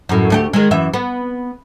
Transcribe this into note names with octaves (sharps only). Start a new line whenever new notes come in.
F#2 A2
D2 A3 G4
D#3 G#3
F#2 E3 E5
B3